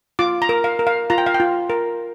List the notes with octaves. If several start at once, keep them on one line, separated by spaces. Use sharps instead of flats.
F4 D6
A#5
A#4
F5
A#4
F5
F4 A#5
G5
F5
G5
F4
A#4